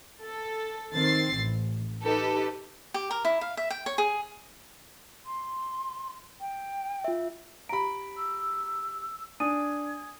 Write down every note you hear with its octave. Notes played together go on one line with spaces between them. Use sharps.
A4
D#3 C4 A6 C7
A1
D#4 G4 A4 B4
G4
A#4
E4
F5
E5
G5
C#5
G#4
C6
G5
F4 E5
G4 A#5 B5 D7
E6
D4 G#5 D#6 G#6 D#7